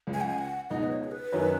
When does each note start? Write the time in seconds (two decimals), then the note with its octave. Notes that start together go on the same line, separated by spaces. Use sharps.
0.07 C#2 C#3 G#3
0.14 G#5
0.21 F#5
0.29 G#5
0.38 F#5
0.70 C#2 B2 B3 D#4 D#5
0.83 B4
0.91 C#5
1.04 G#4
1.11 B4
1.32 F#2 D#3 F#3 C#4